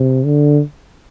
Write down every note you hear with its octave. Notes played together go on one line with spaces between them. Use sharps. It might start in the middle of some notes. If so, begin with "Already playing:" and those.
Already playing: C3
D3